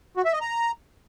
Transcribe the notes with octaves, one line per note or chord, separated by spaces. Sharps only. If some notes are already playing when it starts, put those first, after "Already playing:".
F#4
E5
D#5
A#5